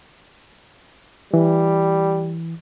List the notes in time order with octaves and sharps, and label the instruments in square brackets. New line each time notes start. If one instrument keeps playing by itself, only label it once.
[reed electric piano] E3 [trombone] G3